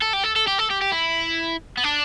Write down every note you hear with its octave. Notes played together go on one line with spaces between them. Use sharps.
A4
G4
A4
A4
G4
A4
G4
G4
E4
B3
D4